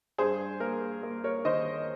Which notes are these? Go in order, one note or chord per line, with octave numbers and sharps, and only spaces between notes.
G2 G#4 C5
A#3 A#4
A#3
A#4 C#5
D#3 C5 D#5